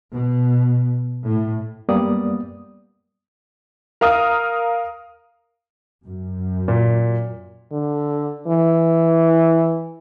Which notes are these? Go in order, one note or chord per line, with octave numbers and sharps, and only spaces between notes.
B2
A2
F#2 G3 A#3 B3 D5 D#6
A#4 F5 D#6 F6
F#2
A#2
D3
E3